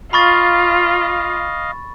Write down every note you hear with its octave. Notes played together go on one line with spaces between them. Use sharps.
F4 D#5 F5 B5 C#6 A6